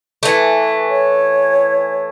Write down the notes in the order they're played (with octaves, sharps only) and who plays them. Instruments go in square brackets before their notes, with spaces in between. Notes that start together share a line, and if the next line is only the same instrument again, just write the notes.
[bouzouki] E3 A3
[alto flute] C#5